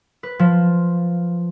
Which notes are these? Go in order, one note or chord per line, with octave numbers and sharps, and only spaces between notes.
B4
F3